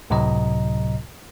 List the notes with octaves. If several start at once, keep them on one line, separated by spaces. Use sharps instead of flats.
C#2 A2 C3 F#3 D#5 A#5